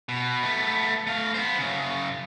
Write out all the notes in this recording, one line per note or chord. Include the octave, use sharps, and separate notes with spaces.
B2
A3 B3
A3 F5
B3 C5
F#2 C#3